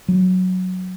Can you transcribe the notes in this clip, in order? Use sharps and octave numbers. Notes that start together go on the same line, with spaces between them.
F#3